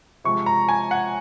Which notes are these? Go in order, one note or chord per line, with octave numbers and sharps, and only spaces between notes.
C3 F3 G#3 C#6
A#5
G#5
F#5